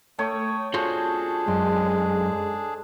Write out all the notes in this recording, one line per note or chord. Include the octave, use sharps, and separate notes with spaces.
A3 C#5 G5 D#6
D4 F4 F#4 G#4 A4 C5
F#2 G#3 C6